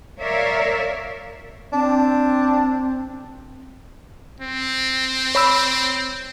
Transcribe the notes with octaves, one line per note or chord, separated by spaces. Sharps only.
A#4 C#5 D5 E5 F5
C4 D4
C4
C#5 B5 E6